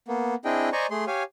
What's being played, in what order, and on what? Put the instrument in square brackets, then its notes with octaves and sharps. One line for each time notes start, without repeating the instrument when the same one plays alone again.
[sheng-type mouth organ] A#3 B3
C4 D4 E4 G#4 D#5 G5
C5 D5 D#5 G#5 A#5 C#6
A3 G#4 C6
G4 C#5 F5 G#5